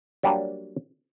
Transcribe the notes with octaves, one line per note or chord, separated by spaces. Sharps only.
F#3 G3 A#3 D4